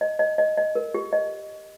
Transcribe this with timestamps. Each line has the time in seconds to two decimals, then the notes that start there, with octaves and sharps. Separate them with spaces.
0.01 D#5
0.19 D#5
0.38 D#5
0.57 D#5
0.75 A#4
0.94 G4
1.13 D#5